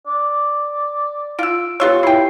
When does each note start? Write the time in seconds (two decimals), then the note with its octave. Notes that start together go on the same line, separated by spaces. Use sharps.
0.07 D5
1.39 F4 F5 E6 D7
1.80 B3 F4 G4 B4 C#5 C#6 E6
2.03 E4 G5 C7